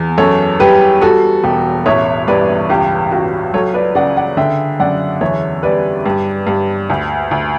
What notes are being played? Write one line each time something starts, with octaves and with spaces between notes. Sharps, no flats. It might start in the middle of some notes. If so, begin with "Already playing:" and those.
Already playing: E2
F#2 A4 C#5
G3 G4 B4
G3 F#4 A4
E1 G4
A1 C#5 E5
G2 B4 D5
C#2 G4
C#2 F#4
F#3 A4 C#5
B4 D5
C#3 D5 F#5
D5 F#5
D3 E5 G5
F#2 D5 F#5
E2 C#5 E5
G3 B4 D5
G2
G2
D2
D2